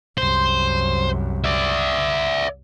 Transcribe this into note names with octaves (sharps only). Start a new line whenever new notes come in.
C2 F#2 C5
D5 E5